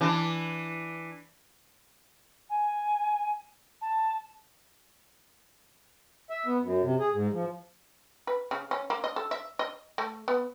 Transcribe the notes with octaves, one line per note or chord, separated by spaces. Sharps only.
E3 D4
G#5
A5
E5
B3
F#2
C3
G#4
G#2
F3
B4
C#3
C#4
A#3
D#5
A4
E5
D#5
A3
B3